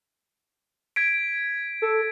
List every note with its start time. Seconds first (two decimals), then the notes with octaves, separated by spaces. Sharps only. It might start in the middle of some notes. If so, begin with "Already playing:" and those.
0.96 G#6 B6 D7
1.82 A4